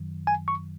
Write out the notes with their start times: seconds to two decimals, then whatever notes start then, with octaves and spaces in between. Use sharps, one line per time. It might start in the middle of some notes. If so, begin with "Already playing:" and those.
Already playing: F#2 D#3 F#3
0.27 G#5
0.48 C#6